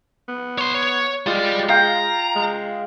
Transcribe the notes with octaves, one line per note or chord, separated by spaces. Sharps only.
B3
C#5 C6
C#5
G#3 F4 G4 D5
F5 G5 A#5
G#3